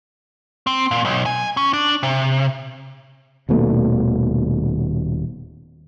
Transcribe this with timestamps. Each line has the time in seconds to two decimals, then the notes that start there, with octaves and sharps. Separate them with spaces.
0.67 C4
0.91 A#2
1.05 B1
1.26 G#5
1.57 C#4
1.73 D4
2.03 C3
3.49 D#1 D#2 B2 A3